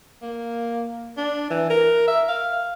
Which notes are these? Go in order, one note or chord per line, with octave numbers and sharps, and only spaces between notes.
A#3
D4
E3
A#4
E5
F5